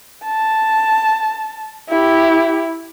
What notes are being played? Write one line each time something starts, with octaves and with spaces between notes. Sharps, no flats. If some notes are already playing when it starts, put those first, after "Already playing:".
A5
E4 G4